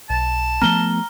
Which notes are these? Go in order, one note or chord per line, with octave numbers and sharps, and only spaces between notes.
B1 A5
F3 A3 B3 A#5 F6 G7